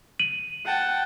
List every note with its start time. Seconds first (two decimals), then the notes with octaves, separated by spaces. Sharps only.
0.19 D#7 F#7
0.65 F#5 G5 A5